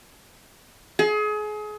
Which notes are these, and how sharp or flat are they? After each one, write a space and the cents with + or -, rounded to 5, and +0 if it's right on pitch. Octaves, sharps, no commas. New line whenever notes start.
G#4 +30